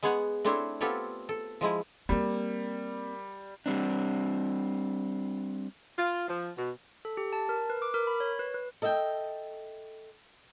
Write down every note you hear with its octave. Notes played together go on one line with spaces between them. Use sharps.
G#3 B3 G#4 C#5 F#5
A3 C4 D4 E4 C5 C#5
B3 C4 F4 G4 A4 C#5
A4
F3 G#3 E4
G3 A#3 C4 A#4 D5
G3 C4 D4
F4
F3
B2
A4
G4
A5
A#4
B4
D6
A#4
B5
C#5
B4
B4
A4 D#5 E5 F#5 G5